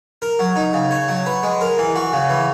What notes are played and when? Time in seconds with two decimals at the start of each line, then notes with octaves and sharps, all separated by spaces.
0.22 A#4
0.39 F#3
0.56 D#4
0.73 C#3
0.91 C#5
1.08 F#3
1.26 B4
1.43 G#3
1.61 A#4
1.78 E3
1.96 F#4
2.13 C#3
2.30 E3